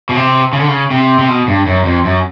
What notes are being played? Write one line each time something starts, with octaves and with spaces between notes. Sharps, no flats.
B2
C3
C#3
D3
C#3
C3
C3
B2
G2
F#2
F2
F#2